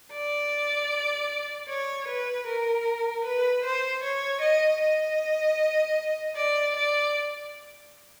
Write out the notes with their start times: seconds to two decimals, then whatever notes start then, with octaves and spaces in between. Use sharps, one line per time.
0.13 D5
1.69 C#5
2.08 B4
2.46 A#4
3.24 B4
3.64 C5
4.03 C#5
4.41 D#5
4.81 D#5
6.36 D5
6.76 D5